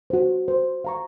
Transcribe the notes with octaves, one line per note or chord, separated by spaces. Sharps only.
F#4 C5
C5
F5 A#5 C#6